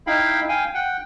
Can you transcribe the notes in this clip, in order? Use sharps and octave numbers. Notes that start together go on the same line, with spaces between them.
D#4 E4 F5 G5 B5
F5 G5 G#5
F#5 G5